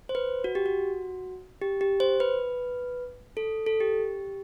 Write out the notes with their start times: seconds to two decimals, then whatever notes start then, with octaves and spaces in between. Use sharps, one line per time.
0.09 C5
0.15 B4
0.44 F#4
0.55 G4
0.66 F#4
1.62 G4
1.81 G4
2.00 C5
2.20 B4
3.37 A4
3.66 A4
3.80 G4